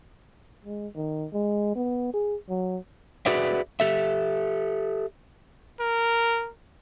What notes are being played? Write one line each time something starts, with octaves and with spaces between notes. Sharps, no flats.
G#3
D#3
G#3
B3
G#4
F#3
F#4 G#4 B4 D5 E5
G4 A4 E5
A#4